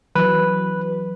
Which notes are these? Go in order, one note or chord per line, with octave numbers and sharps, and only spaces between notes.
E3 F#3 B4